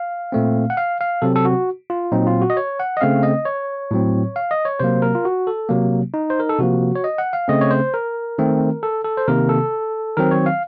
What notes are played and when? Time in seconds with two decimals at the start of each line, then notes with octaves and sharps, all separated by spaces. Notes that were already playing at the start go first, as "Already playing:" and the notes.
Already playing: F5
0.32 A#2 A3 C4
0.70 F#5
0.77 F5
1.01 F5
1.22 C3 F#3 C4 A4
1.36 A4
1.45 F#4
1.90 F4
2.12 A#2 F#3 C4 D#4
2.27 F4
2.42 F#4
2.50 D#5
2.57 C#5
2.79 F#5
2.97 D#5
3.01 C#3 A3 C4 F5
3.23 D#5
3.45 C#5
3.91 A2 F#3 C4
4.36 F5
4.51 D#5
4.65 C#5
4.80 C3 F#3 A#3 C5
5.02 A#4
5.15 F4
5.25 F#4
5.47 A4
5.69 C3 F#3 A#3
6.14 D#4
6.30 C5
6.40 A#4
6.49 A4
6.59 C3 F3 A#3 F#4
6.96 C#5
7.04 D#5
7.18 F#5
7.33 F5
7.48 C#3 A3 C4 D#5
7.61 C#5
7.70 C5
7.94 A#4
8.38 D#3 A3 C4
8.83 A4
9.04 A4
9.17 C5
9.28 C3 D#3 A#3 A#4
9.49 A4
10.17 D#3 F#3 C4 A#4
10.31 C#5
10.46 F5